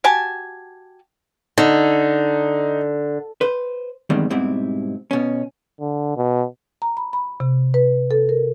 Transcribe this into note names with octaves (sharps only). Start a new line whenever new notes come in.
F#4 G4 G#5 A5
D3 D#4
B4 C5
E2 G2 D#3 G3 G#3 C4
G#2 B2 G3 C4 E4
B2 C#4
D3
B2
A#5
B5
B5
C3
B4
A4
A#4